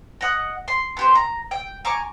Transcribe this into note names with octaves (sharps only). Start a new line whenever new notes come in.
D#5 F#5 D#6
C6
B3 G4 C5
A#5
G5
G#5 A#5 C#6 D6